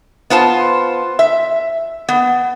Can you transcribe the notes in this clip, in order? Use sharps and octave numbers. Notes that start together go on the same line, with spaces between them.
B3 F4 C5 A5
E5
B3